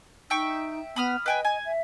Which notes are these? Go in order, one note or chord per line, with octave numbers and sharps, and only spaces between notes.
D#4 E5 G5 C#6
B3 B5 D#6 F6
B4 D#5 G5 G#5
G#5
E5